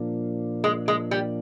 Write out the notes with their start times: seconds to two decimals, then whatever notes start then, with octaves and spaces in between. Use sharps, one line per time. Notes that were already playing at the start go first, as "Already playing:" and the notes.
Already playing: A#2 F3 A#3 D4
0.64 G#3
0.88 G#3
1.11 G3